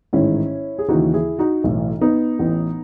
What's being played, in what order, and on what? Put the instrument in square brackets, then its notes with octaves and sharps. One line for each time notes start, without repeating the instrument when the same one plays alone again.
[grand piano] A1 G#2 D#3 C#4 E4
G#4
D#2 C#3 E3 D#4 F#4
E4 G#4
D#4 F#4
B1 A2 E3
B3 D#4
A1 A2 E3